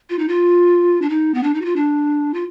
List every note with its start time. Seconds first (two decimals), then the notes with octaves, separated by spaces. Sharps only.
0.10 F4
0.19 D#4
0.28 F4
1.02 D4
1.10 D#4
1.34 B3
1.43 D4
1.54 D#4
1.62 F#4
1.65 F4
1.76 D4
2.34 F4